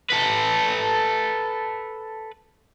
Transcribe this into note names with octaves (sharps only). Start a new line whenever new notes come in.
A4 B4